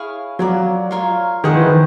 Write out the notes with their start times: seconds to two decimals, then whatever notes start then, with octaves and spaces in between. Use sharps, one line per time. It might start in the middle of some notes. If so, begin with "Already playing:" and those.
Already playing: E4 G#4 C#5 F5
0.39 F#3 F4 A#4 D5
0.91 F4 A#4 C#5 F5
1.44 D#3 G#4 C5 D#5 F#5
1.55 E3
1.66 D#3